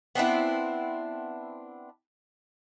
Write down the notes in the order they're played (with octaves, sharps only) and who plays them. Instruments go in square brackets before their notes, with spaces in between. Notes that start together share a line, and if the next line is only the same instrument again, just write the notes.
[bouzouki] B3 C4 D4 E4